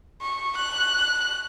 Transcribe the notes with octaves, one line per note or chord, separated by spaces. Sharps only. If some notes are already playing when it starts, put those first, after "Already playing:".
C#6
F#6